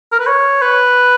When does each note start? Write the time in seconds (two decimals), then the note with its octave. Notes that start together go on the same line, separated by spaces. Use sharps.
0.12 A#4
0.19 B4
0.27 C#5
0.62 B4